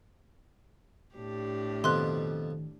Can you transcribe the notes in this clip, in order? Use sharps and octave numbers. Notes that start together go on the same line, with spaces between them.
A2 D4 G4
F2 B2 D#3 C6 F#6